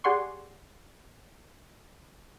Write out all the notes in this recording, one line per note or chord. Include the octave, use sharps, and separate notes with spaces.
G4 G#4 D5 F#5 C6 C#6